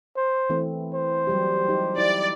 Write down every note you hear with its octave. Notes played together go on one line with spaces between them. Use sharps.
C5
E3 A3 C4
C5
F#3 G3 G4
D#4 G4
E4 D5